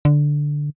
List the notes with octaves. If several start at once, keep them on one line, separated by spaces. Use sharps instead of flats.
D3